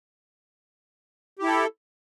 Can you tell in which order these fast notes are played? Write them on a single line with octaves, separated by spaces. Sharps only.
G4 E4 A4